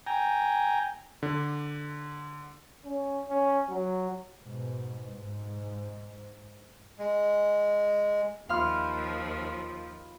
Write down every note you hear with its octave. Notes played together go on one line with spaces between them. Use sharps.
G5 G#5 A#5
D3
C#4
C#4
F#3
G#2 B2
G#2
G#3
D#2 F3 F4 F5 B5 F6